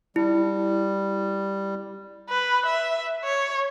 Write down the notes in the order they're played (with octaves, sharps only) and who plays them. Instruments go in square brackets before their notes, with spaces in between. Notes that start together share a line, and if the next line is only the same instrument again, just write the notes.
[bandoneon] G3 [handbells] E4
[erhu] B4
E5
C#5